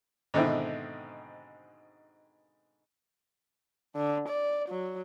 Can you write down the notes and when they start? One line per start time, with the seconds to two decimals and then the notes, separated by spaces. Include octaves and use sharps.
0.34 G#2 B2 D3 D#3 C4 E4
3.96 D3
4.29 D5
4.69 F#3